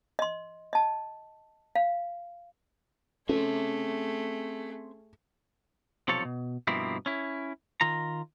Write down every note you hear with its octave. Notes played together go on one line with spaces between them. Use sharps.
D#5 C6
D#5 A5
F5
A3 C4 C#4 G#4 A4 E5
B1 C3 F3 A4 C#5
B2
G2 B2 F3 A#3 C4 E4
C#4 E4
D#3 F4 A#5